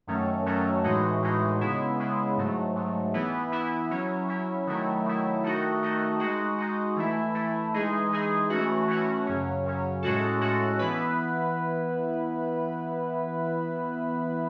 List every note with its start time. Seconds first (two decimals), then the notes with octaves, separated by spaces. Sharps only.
0.07 F#2 D#3 F#3 A3 C#4
0.46 F#2 D#3 F#3 A3 C#4
0.84 A2 E3 G#3 D#4 F#4
1.22 A2 E3 G#3 D#4 F#4
1.61 C#3 G#3 B3 E4
1.99 C#3 G#3 B3 E4
2.37 G#2 F#3 A3
2.75 G#2 F#3 A3
3.14 E3 B3 E4
3.52 E3 B3 E4
3.91 F#3 C#4 E4
4.28 F#3 C#4 E4
4.67 D#3 F#3 A3 E4
5.05 D#3 F#3 A3 E4
5.43 D#3 A3 D#4 F#4
5.82 D#3 A3 D#4 F#4
6.20 G#3 D#4 F#4
6.58 G#3 D#4 F#4
6.96 E3 A3 E4
7.35 E3 A3 E4
7.73 E3 G#3 D#4 G#4
8.11 E3 G#3 D#4 G#4
8.50 E3 A3 C#4 F#4
8.88 E3 A3 C#4 F#4
9.27 F#2 C#3 F#3 C#4
9.65 F#2 C#3 F#3 C#4
10.02 A2 G#3 C#4 F#4 A4
10.41 A2 G#3 C#4 F#4 A4
10.79 E3 B3 E4 B4